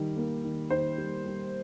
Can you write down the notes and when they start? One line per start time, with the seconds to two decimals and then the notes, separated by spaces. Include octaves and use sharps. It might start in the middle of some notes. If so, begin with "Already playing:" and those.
Already playing: D#3 G3
0.16 A#3
0.44 D#3
0.70 D#3 C5
0.98 G3
1.25 G3